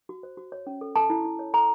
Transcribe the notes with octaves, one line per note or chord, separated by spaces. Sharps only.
F#4
C5
F#4
C#5
C#4
A4
A4 A5
E4
E4
C#5
A4 A#5